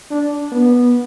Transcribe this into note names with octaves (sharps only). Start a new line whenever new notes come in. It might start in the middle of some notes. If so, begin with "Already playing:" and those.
D4
B3